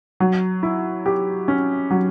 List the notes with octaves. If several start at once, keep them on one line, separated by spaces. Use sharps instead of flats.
F#3
E4
G4
C#4
F#3